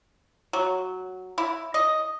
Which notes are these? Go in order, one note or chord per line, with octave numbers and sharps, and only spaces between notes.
F#3
E4
D#5